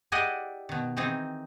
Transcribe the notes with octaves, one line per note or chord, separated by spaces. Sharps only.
E4 G4 G#4 D5 D#5 F#5
B2 D#3
D#3 E3 C4 D#4 G#4